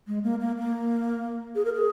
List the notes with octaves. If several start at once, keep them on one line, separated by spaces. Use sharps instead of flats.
G#3
A#3
A#3
A#3
G#4
A#4
G#4